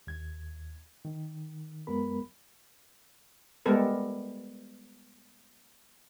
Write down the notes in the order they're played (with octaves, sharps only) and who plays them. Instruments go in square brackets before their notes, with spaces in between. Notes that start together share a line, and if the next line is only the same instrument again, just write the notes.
[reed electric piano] D#2 G#6
D#3
F#2 F#3 G#3 B3 A#4 B5
[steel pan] G3 G#3 B3 A4 A#4